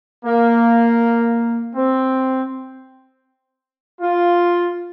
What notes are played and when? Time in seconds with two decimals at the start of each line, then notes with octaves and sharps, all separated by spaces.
0.25 A#3
1.75 C4
4.01 F4